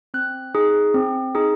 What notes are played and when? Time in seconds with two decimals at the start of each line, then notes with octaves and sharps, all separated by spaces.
0.14 C4 F#6
0.54 D#4 G#4
0.94 C4
1.35 D#4 G#4